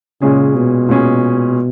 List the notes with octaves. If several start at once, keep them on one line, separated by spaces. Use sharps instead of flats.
A#2 C#3 G#3 C#4 G#4
B2
A#2 G#3 C#4 G#4